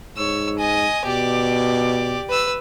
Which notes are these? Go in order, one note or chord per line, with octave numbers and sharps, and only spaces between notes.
G#2 C#5 E6
D#5 G#5
B2 G4 D5
B4 E6